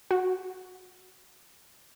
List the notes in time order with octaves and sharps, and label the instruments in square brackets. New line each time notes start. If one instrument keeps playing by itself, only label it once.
[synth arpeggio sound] F#4